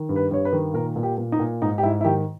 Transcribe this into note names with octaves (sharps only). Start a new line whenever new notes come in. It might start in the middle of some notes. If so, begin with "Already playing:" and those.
Already playing: D#3
G2
B4
G2 C#5
B4
D#3
A#2 A#4
A#2
G4
A#2
D#4
A#2
G#2 D#4
G4
G#2 E4
E4
D#3 G4